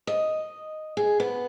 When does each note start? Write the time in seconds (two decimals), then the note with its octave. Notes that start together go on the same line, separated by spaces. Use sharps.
0.07 D#5
0.97 G#4
1.20 B3